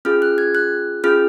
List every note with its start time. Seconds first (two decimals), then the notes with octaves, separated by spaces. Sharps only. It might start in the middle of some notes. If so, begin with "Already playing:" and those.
0.05 C#4 F4 G#4 F6
0.22 F#6
0.38 G#6
0.55 F#6
1.04 C#4 F4 G#4 F6